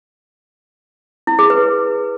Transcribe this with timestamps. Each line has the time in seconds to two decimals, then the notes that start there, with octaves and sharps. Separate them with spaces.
1.27 E4
1.39 G#4
1.50 B4